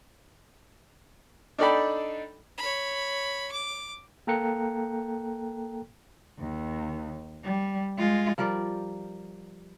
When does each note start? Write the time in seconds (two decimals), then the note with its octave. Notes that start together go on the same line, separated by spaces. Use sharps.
1.58 D4 D#4 A4 D5 G5 B5
2.58 C#5 B5
3.52 D6
4.27 A#3 A4 G5 A#5 F#6 C#7
6.39 D#2
7.44 G3
7.97 G#3 F4
8.38 F3 G3 A#4 D5